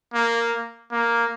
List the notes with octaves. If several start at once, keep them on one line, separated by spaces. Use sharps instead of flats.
A#3
A#3